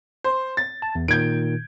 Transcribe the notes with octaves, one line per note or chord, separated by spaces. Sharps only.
C5
A6
A5
E2
A#2 D#3 G6 G#6 D7